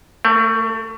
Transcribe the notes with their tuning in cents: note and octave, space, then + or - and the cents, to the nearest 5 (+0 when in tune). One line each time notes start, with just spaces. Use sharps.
A3 +25 A#4 -20